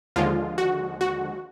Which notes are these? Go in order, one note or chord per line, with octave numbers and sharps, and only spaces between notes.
D#2 D3 F3 G#3 F4
F#4
F#4